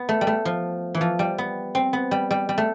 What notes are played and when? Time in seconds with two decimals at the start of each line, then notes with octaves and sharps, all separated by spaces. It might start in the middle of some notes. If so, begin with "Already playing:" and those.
Already playing: B3
0.09 A3
0.21 G3
0.27 A3
0.45 F3
0.94 E3
1.01 F3
1.19 G3
1.38 B3
1.75 C4
1.93 B3
2.11 G3
2.31 G3
2.49 G3
2.58 A3